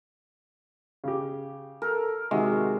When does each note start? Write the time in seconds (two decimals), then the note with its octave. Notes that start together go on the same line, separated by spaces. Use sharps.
1.04 C#3 G4
1.82 A4 A#4
2.31 C3 D#3 G#3 F#4